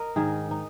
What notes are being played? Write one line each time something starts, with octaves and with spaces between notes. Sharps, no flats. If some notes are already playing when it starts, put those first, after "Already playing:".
Already playing: A#4 D#5
G#2 D#3 G#4
D#4